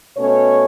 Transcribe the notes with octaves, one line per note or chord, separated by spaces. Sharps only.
B2 A3 C#4 C#5